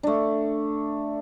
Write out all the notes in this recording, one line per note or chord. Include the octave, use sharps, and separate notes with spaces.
A3 D4